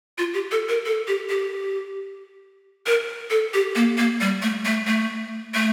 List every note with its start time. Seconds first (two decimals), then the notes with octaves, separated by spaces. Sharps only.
0.18 F4
0.34 G4
0.51 A4
0.69 A#4
0.85 A4
1.08 G4
1.29 G4
2.86 A#4
3.30 A4
3.54 G4
3.75 A#3
3.98 A#3
4.21 G3
4.42 A3
4.65 A3
4.87 A3
5.55 A3